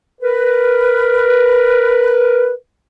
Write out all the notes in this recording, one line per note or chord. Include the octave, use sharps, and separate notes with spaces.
A#4 B4